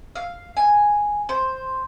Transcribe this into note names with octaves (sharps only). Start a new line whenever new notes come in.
F5
G#5
C5